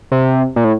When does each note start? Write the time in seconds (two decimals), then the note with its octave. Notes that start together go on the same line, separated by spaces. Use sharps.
0.12 C3
0.56 A#2
0.64 A2